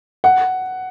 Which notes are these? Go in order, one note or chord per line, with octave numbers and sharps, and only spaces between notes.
F#5